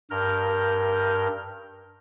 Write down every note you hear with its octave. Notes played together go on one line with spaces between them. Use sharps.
G2 A#4 F6 G6